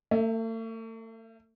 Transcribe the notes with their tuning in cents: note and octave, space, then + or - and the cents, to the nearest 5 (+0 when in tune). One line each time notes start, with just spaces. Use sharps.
A3 +40 E5 -5